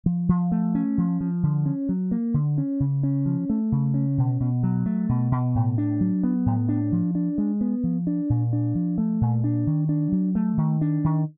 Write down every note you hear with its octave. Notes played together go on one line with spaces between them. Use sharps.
F3
F3
A3
C#4
F3
F3
D3
C#4
F#3
A#3
D3
C#4
C#3
C#4
F3
A3
C#3
C#4
B2
B2
F#3
A3
B2
B2
A2
D4
F#3
B3
A2
D4
F3
D4
G#3
B3
F3
D4
A#2
D4
F3
A3
A#2
D4
D#3
D4
F#3
A3
D#3
D4
D#3